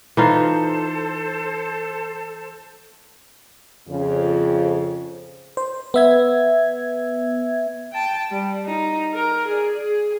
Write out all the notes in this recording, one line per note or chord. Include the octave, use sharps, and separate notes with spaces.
E3 D#4 F4 A4 C5
F2 C#3
C5
B3 E5 G#6
G5 A5
G3
D#4
A#4
G#4 D5
G#4